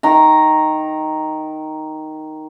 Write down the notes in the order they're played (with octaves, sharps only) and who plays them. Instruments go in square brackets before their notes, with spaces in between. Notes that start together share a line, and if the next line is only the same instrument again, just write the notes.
[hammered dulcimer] D#3 A#5